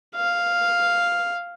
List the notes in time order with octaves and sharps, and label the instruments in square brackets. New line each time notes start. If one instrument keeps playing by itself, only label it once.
[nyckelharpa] F5